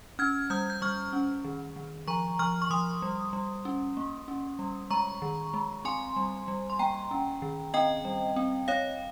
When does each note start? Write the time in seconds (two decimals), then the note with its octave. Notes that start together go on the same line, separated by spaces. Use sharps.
0.19 C#4 F6 G#6
0.50 G3 D#6 G6
0.70 G6
0.82 G3 C#6 F6
1.13 C#4
1.44 D#3
1.76 D#3
2.07 F3 A#5 C#6
2.39 F3 C#6 F6
2.62 C#6
2.70 F3 C6 D#6
3.02 G3
3.33 G3
3.65 C#4
3.97 A#3
4.28 C#4
4.59 G3
4.90 G#3 A#5 C#6
5.22 D#3
5.54 G#3
5.85 C4 G#5 C6
6.16 G3
6.48 G3
6.70 C6
6.79 A#3 G5 A#5
7.11 C#4
7.42 D#3
7.74 C4 D#5 G5
8.05 G3
8.36 C4
8.68 C4 C#5 F5